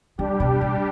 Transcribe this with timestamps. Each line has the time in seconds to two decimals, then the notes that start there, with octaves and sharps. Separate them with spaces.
0.18 D3 G3 D4 G4
0.40 B2
0.61 A2